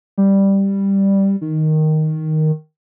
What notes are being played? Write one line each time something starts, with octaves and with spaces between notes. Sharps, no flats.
G3
D#3